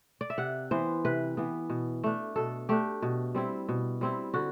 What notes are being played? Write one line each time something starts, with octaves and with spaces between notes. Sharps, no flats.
D5
E5
C3 F#5
E3 B3 C5
C3 B4
E3 B3
B2
A3 D4
B2 A4
A3 D4 G4
B2
G3 C4 E4
B2
G3 C4 E4
D3 F#4